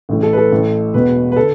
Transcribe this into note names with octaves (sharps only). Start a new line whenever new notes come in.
A1 A2 E3
A4
B4
A4
A1 A2 E3
E1 E2 B2 B4
B4
D3 A4